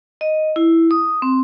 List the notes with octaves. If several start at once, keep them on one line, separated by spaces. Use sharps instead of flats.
D#5
E4
D#6
C4